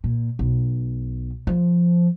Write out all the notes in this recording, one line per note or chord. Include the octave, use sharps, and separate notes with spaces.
A#2
B1
F3